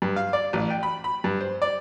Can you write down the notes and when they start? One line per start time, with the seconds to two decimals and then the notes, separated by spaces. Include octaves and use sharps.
0.02 G2
0.16 F5
0.33 D5
0.53 A1
0.70 G5
0.83 B5
1.04 B5
1.24 G2
1.41 C5
1.62 D5